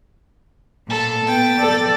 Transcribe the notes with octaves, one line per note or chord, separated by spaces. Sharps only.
A#2 A4 A5
B3 G5 A6
A4 D5